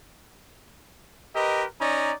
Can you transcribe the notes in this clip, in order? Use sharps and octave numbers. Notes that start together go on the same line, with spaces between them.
G4 A#4 B4 D#5
C#4 D#4 D5 A#5